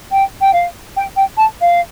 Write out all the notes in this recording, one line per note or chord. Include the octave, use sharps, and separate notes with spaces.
G5
G5
F5
G5
G5
A5
F5